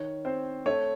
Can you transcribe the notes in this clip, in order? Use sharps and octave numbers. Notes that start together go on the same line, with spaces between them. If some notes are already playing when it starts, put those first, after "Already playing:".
Already playing: D#3 C#5
C4 C5
A3 C#5